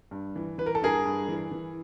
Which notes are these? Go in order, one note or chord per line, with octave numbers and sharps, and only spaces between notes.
G2
E3
E3 B4
A#4
A4
G2 G#4 A#4
G2
E3
E3